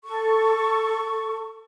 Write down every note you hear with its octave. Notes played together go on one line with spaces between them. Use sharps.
A4 C#6